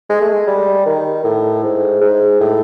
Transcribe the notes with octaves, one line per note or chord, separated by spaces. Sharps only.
G#3
A3
G#3
G3
D#3
A2
G#2
G#2
A2